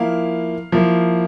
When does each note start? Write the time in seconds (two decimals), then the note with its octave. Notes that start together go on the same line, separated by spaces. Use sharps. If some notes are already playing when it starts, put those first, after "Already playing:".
Already playing: F3 A#3 E4 F5
0.72 F3 A#3 E4